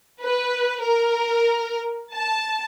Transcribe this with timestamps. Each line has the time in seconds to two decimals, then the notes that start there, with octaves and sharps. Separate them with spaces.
0.22 B4
0.83 A#4
2.14 A5